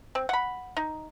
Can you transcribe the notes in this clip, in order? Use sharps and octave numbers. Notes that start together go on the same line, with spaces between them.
C4
F#5 B5
D#4